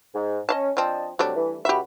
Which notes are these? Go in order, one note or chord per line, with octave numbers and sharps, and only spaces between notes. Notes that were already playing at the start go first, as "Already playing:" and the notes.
G#2
C#4 D#5 F5 A5
F3 C4 D4 D#5 A5
C3 F#3 G3 A3 D4
E3
C#2 F#4 G4 E5 B5